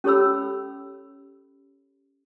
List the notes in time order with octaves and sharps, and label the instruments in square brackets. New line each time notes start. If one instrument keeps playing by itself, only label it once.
[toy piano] C#4 G4 A4 C#5 B5 E6